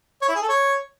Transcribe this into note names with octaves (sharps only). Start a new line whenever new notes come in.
C#5
E4
G#4
A4
C#5